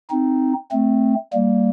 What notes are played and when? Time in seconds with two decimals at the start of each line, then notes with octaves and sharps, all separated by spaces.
0.10 C4 D#4
0.71 A3 C4
1.33 G3 A#3